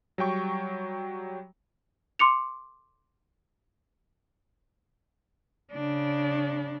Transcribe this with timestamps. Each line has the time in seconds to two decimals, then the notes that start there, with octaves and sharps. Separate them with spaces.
0.18 F#3 G3 G5 C#6
2.19 C6 D6 C#7 F7
5.72 C#3 D4